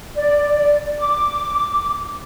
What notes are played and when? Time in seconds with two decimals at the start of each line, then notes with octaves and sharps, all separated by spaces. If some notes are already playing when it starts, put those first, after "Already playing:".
0.15 D5
1.01 D6